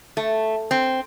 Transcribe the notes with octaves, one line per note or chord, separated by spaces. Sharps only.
A3
C4